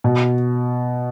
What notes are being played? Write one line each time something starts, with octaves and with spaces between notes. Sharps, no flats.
B2